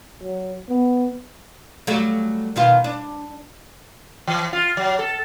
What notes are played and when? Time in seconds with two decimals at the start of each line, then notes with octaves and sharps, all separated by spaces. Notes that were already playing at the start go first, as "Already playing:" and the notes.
0.23 F#3
0.70 B3
1.87 F#3 G3 A3
2.56 B2 D#3 F4
2.84 D4
4.27 E3
4.53 F4
4.77 F#3
4.99 A4